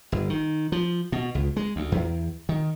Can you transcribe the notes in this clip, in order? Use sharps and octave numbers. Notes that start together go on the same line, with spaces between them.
G1
D#3
F3
B2
C#2
G#3
D2
E2
D#3